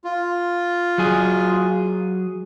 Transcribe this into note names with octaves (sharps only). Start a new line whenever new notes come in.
F4
F#3 G#4